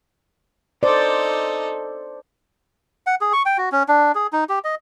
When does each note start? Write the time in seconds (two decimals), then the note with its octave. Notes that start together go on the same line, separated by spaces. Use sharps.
0.83 D#4 A4 C5 D5
3.07 F#5
3.21 G#4
3.33 C#6
3.46 G5
3.58 F#4
3.72 C#4
3.88 D4
4.15 G#4
4.33 D#4
4.49 G4
4.64 D#5